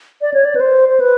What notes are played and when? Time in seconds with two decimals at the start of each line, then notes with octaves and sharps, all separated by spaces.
0.22 D5
0.34 C#5
0.45 D5
0.55 B4
0.61 C5
0.89 C5
1.00 B4